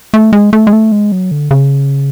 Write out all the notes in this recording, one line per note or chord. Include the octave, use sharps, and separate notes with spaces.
A3
G#3
A3
G#3
A3
G#3
F#3
D3
C#3